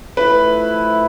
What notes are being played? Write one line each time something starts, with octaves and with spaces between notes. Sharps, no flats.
F3 A3 E4 B4